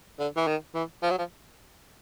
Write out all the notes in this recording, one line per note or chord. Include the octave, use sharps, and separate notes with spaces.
D3
E3
D#3
E3
F3
F#3
F3